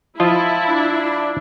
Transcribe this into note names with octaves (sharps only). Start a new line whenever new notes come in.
F3 E4 F4 D#5 A5
D4